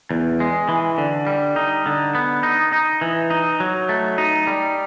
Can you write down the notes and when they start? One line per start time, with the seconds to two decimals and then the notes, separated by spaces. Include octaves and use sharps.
0.11 E2
0.40 G#3
0.69 E3
0.98 D3
1.27 G3
1.56 D#4
1.86 D3
2.15 B3
2.43 D#4
2.72 D#4
3.01 E3
3.30 D#4
3.60 F#3
3.89 A3
4.18 D#4
4.47 G3